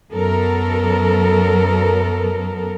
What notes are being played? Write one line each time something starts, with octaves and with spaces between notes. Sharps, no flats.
F#2 F#3 B3 A4 A#4